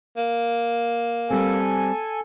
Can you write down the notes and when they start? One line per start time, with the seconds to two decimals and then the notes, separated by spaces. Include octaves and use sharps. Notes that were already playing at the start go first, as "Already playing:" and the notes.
0.17 A#3
1.30 G3 C4 A4 G#5